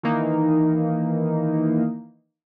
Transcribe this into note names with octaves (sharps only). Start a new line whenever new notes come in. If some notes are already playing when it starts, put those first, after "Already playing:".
D#3 E3 A#3 D#4